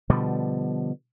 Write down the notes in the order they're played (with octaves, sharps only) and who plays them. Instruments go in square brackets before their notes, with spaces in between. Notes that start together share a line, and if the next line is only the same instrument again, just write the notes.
[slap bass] B2 D3 F3 G3